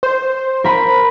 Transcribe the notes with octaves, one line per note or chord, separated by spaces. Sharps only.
C5
A#4 B5